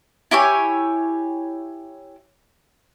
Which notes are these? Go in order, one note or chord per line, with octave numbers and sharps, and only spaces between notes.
E4 G4 C#5 G#5